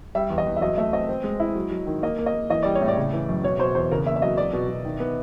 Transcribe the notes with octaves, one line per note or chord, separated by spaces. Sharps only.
G3 E5
E2
D#5
E2
E5
F#3 D#5
A3 E5
C4 D#5
C4
G#3
E4
F#3
F#3
D#3
A#3 D#5
A#3
D#5
A#3
E3 D#5
G3 D5
C#5
A2
D5
C#3
E3
F#2
B2 C#5
B2 C5
E2 C5
C#3 A#4
A#3 E5
E5
F#3 D#5
F#3 D5
B2
B2
D#3
B3